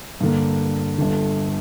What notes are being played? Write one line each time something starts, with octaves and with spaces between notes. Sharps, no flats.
G2 D3 A#3
G1 G2 D3